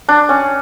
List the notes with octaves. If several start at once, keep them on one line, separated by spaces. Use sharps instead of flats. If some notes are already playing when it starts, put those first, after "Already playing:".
D4
C#4